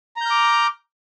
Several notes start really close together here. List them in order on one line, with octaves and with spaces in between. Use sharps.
A#5 G6 F6 D6